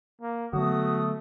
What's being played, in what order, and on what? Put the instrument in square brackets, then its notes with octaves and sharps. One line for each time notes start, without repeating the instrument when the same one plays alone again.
[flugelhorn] A#3
[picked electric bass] D3 F#3 B3 [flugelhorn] A3 [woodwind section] F#4 D#6